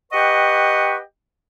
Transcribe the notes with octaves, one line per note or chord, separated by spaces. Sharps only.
G4 B4 D#5 F#5 G5 C#6